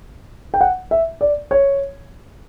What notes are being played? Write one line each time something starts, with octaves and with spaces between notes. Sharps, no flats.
G5
F#5
E5
D5
C#5